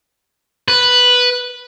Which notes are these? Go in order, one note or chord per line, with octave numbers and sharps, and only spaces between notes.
B4